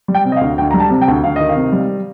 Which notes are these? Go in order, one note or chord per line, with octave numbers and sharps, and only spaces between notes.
G3
G5
C3
D#5
F5
D2
D2 G5
G3 A#5
A5
C3
G5
D2
D2 F5
D#3 D#5
F5
C3
G3